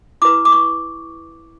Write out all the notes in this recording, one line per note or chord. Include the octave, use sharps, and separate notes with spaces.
E4 B4 D6
D6
C#6